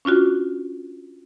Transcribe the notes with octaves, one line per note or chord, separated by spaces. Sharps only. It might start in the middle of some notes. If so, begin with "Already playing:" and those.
C#4 D4 F4 F#4